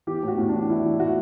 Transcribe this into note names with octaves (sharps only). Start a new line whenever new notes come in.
E3 G4
A2 F#4
A2
D4
E3
E3 E4
E3
A2 F#4